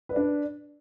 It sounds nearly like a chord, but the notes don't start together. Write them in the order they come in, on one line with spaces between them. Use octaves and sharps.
B4 D5 D4